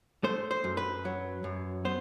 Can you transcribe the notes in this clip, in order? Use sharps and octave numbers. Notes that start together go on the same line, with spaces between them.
A3 C5
C5
F#2
B4
F#3
F#2
B3 C5